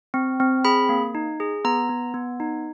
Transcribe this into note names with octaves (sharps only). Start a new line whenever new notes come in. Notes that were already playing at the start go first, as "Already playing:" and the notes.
C4
C4
G#4 B5
A#3
D#4
G#4
B3 A#5
B3
B3
D#4